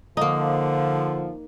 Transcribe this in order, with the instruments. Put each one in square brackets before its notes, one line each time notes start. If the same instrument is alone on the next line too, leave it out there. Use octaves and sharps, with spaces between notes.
[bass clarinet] D3 [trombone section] F3 [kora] A#3 D#4